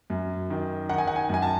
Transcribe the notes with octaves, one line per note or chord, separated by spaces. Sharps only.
F#2
D#3
D#3 F#5
G#5
F#5
G#5
F#2 G#5
A5